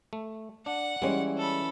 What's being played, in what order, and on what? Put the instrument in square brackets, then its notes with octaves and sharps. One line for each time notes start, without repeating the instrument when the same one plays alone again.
[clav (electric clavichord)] A3
[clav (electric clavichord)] D4 [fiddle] F#5
[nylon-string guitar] E3 C#4 [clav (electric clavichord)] G3 G#3
[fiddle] A4 B5